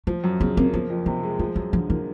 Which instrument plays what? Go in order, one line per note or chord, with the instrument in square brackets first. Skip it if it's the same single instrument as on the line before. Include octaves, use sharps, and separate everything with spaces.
[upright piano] F3 [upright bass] A3
[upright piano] F#2
[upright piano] C#3 [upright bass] B3
[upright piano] A#3 [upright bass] C4
[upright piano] F3 [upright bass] B3
[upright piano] F2
[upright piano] C3 [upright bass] B3
[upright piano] G#3
[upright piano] F3 [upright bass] A3
[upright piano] F#2 [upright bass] F#3
[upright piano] D3 [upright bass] F3
[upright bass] E3 [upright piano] A#3